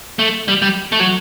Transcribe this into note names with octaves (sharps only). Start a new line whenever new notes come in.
A3
G3
G3
A3
F#3